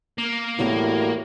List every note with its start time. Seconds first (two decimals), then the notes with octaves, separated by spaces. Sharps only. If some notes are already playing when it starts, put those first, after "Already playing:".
0.18 A#3
0.59 E2 A2 G3 F#4